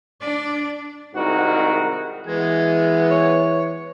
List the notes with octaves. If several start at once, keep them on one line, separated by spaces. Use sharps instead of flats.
D4 D5
C2 G#2 D#3 F#4 A#4
E3 G#3 B3 G#5
C#5